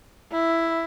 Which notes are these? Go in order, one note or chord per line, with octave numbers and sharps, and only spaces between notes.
E4